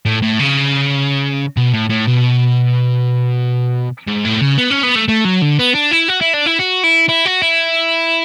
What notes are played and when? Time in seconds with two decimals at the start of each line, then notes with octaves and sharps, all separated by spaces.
0.05 A2
0.22 A2
0.40 C#3
1.57 B2
1.73 A2
1.89 A2
2.07 B2
4.07 G#2
4.25 A2
4.41 C#3
4.58 B3
4.70 C#4
4.83 B3
4.96 A3
5.08 A3
5.25 F#3
5.42 D3
5.59 B3
5.74 D4
5.91 E4
6.08 F#4
6.21 E4
6.33 D4
6.46 E4
6.59 F#4
6.83 E4
7.09 E4
7.26 F#4
7.42 E4